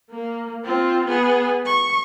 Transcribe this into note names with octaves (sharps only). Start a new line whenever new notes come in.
A#3
C4 F4
B3 G#4
C#6